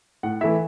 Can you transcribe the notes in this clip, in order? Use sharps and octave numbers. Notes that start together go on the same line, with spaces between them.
A2 F#5
E3 A3 E4 E5